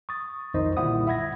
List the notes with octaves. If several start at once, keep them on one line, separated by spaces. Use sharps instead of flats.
C#6 D#6 A6
B1 F2 D#3 D#4 C5 D#5
A#2 D3 G3 E4 F#5 D#6
E5 F#5 B5 G#6 A#6